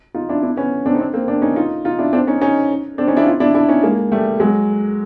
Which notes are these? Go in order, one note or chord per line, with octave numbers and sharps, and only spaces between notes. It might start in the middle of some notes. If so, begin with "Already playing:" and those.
D#4 F4
D4 E4
D4 E4
B3 C#4
C4 D4
D#4
C4 D4
A#3 C4
C4 D4
C#4 D#4
D#4 F4
D#4 F4
D4 E4
C4 D4
C#4 D#4
C#4 D#4
C4 D4
C#4 D#4
D4 E4
D#4 F4
D4 E4
D4 E4
C#4 D#4
G#3 A#3
G3 A3
F#3 G#3